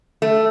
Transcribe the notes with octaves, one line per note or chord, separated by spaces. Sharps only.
A3